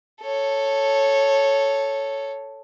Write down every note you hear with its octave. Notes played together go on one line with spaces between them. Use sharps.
A4 C#5